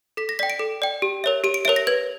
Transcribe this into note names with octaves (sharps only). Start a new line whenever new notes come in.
A4 B6
A#6
D5 G5 B6
D7
A4
D5 G5
G4
A#4 C#5 E5
G4 D#7
D7
A#4 C#5 E5 D7
A#6
B4 G#6